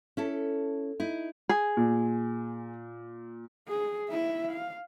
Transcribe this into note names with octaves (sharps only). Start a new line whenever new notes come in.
C#4 E4 A4
D#4 E4
G#4
A#2
G#4
E4 E5
F5